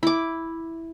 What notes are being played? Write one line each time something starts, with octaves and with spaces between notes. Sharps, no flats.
E4 D6